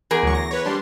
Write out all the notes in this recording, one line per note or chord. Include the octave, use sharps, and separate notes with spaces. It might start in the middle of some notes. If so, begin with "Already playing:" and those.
E2 G#4 A#4
D2 F#3 C#6
A#6
B4 C#5
G3 D4 C6